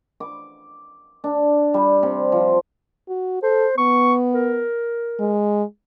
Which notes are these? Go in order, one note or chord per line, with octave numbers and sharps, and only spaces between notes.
D6
D4
G3
C3
F3
F#4
A4 C5
B3 C#6
A#4
G#3